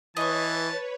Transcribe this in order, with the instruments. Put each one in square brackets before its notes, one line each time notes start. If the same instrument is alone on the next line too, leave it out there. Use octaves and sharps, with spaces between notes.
[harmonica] E3 [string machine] B4 C#5 [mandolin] D#5 C#6 [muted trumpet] A5